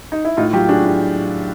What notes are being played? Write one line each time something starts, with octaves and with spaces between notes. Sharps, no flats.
D#4
E4
A2 D#4 F4
F#3 F4 G4
D4 F#4 G#4
A2